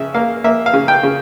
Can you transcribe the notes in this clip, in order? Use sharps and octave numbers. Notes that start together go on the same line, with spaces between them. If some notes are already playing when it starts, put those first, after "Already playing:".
Already playing: C#3 E5
A#3 F5
A#3 E5
F5
C#3
G5
C#3